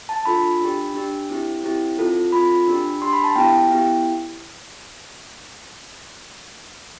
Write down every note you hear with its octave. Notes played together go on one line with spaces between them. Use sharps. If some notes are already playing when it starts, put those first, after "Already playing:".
A5
D4 F4 A4 B5
D4 G4
D4 G4
C4 E4 G4
C4 E4 G4
C4 F4 A4
C4 F4 A4 B5
D4 G4
D4 G4 C6
B5
A5
B3 E4 G4 G5
B3 E4 G4